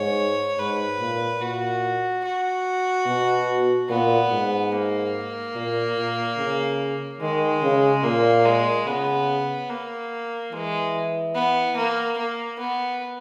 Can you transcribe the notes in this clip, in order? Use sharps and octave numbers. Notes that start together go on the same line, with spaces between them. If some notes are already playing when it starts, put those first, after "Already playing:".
Already playing: G#2 C#5
G#2 B4
A#2
A#2 F#4
F#4
B2
A#2 B3
G#2
A#3
A#2
A#2
C#3
D#3 G#3
C#3
A#2 A#3
G#3
C#3 B3
A#3
E3 G#3
B3
A#3
A#3
B3